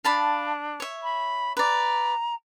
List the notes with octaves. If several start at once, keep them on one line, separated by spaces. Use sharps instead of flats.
D4 F5 A5 B5
C#5 E5
B5
B4 D5 A#5